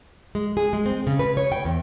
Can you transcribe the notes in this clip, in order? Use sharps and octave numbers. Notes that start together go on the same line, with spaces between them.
G#3
G#4
G#3
C4
C#3
B4
C#5
G5
E2